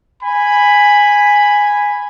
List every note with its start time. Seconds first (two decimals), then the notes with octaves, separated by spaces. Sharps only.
0.23 G#5 B5